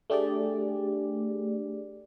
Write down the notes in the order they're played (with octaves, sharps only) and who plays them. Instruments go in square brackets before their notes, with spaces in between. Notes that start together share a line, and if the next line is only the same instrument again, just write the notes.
[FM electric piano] A3 D4 G4 G#4 D5